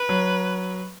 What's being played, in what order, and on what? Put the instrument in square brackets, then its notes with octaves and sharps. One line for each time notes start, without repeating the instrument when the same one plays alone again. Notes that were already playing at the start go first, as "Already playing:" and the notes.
Already playing: [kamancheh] B4
[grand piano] F#3